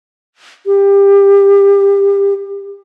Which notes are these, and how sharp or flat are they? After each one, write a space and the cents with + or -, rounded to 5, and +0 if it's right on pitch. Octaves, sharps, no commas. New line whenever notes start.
G4 +25